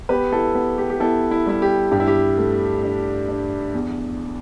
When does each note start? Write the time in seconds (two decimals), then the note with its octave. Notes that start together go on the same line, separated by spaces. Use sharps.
0.09 B3 G4 B4
0.32 E4 A4
0.55 B3
0.78 G4
0.90 G4
1.00 B3 E4 A4
1.31 E4
1.46 G3 E4
1.62 G4
1.92 G2 G4
2.00 E4
2.07 G4
2.38 A3
2.83 D4
3.29 D4
3.74 E2